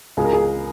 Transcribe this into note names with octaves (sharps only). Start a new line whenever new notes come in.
C#2 G#4
A#4
G#4